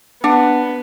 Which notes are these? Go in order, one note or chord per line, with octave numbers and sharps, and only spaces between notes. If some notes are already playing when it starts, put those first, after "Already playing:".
B3 D4 F#5